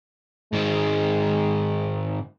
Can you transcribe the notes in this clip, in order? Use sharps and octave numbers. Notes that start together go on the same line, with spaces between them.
G#2 D#3 G#3